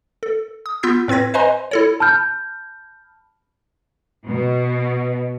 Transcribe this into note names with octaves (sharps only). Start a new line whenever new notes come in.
A4
D#6
B3 F4 E6 G6 B6
A2 C4 B4 G#6 A#6
B4 C5 D#5 G#5 A#5 C6
E4 A4 C#5
A5 B5 F6 G6
B2